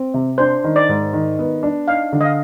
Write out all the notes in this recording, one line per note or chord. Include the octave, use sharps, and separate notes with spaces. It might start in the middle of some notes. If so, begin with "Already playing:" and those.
Already playing: C4
C3
D4 C5
D#3
D5
G#2
D#3
B3
D4
D#4 F5
D3
D#5
F5